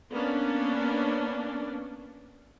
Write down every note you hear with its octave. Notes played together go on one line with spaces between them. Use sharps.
A#3 B3 C#4 D4 D5